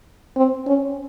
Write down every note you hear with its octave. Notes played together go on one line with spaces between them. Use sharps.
C4
C#4